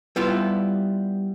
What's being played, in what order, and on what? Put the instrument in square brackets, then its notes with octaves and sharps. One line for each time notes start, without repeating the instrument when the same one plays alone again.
[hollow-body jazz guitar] G3 B3 E4 F4